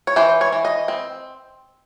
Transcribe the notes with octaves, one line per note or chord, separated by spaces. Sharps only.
C#5
E3 C5
C#5
E3
D#5
C4